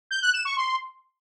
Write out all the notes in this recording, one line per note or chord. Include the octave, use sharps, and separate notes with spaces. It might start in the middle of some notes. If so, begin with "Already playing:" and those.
G6
F#6
E7
C#6
C6